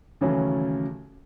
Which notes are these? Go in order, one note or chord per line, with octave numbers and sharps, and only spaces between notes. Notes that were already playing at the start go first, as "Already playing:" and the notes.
D#2 C#3 E3 F#3 A3 C#4